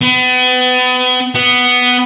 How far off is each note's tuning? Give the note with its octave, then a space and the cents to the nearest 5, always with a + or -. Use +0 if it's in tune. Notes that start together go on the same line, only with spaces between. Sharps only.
B3 +35
B3 +5